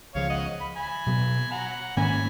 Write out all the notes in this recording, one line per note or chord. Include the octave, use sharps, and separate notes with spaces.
C#2 C#3 F3 C#5 F5
D#5 F#5
B5
G#5 B5
B2 F#3 B3
F#5 A#5
G#2 D#3 A#3 C#4 G#5 B5